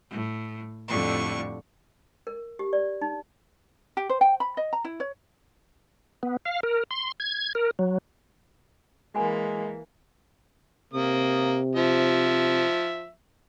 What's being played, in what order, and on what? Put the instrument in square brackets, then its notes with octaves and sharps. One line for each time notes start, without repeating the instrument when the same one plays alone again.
[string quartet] A2
F2 A2 D3 G3 C#6
[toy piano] A#4
G4
D5
D#4
[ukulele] G4
C5
G5
B5
D#5
A#5
E4
C#5
[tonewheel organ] B3
F5
A#4
C6
G#6
A#4
F#3
[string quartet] E3 A#3 [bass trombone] G#3 [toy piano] F#4 G#5 B5
[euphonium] C3 [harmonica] A#3 D#6
[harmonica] F3 E5